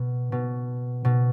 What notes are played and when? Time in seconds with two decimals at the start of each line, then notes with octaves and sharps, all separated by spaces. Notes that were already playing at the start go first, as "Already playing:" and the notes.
Already playing: B2
0.32 B2
1.05 B2